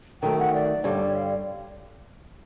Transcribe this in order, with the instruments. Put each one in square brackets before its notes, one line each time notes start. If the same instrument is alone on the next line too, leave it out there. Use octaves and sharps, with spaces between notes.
[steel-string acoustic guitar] D#3 F#3 A3 [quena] G5
[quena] F#5
D5
[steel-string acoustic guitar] G2 D3 G3 [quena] C#5
[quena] F5